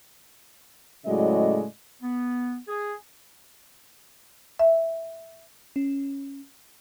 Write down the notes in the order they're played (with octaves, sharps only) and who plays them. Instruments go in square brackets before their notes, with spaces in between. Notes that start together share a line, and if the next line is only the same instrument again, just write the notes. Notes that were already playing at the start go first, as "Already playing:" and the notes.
[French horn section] A2 C#3 F#3 G#3 D5 D#5
[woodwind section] B3
G#4
[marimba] E5
[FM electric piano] C#4